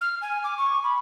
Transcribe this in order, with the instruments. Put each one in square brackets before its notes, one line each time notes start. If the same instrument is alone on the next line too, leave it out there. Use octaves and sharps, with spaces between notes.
[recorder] F6
G#5
D6
C#6
B5